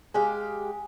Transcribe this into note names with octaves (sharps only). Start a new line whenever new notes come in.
G#3 G4 F5